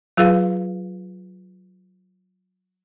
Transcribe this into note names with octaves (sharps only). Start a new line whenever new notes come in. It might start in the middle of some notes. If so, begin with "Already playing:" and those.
F#3 F4 G#4 B4 F5